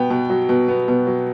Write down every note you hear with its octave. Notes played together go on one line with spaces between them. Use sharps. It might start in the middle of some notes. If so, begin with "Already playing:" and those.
Already playing: B2 B3 G5
B2
F#3
B2
B3
B2
F#3